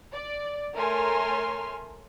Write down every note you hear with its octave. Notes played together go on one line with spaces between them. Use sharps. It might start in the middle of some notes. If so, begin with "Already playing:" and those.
D5
A3 A#4 C#5 G#5 C6 F6